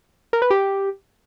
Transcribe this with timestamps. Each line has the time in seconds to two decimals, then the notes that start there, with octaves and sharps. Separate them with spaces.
0.33 A#4
0.42 B4
0.50 G4